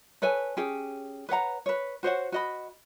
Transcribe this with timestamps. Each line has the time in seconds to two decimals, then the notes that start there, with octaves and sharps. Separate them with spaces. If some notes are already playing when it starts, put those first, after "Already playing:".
0.22 A4 B4 C#5 G#5
0.57 C#4 G4 G#4 G5
1.29 B4 C#5 F#5 A#5
1.66 B4 C#5
2.03 F#4 C5 C#5 F#5
2.32 F#4 D#5 B5